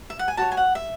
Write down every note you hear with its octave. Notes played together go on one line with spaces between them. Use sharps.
E5
F#5
G#5
F#4 C#5 A5
G#5
F#5
E5